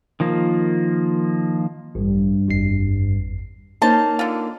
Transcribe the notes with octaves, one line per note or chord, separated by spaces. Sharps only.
D#3 F3 A#3
A1 G2
G#1 F2 C7
A#3 C#4 D#4 C5 A5
D3 F4